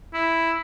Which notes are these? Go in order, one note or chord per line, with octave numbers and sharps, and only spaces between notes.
E4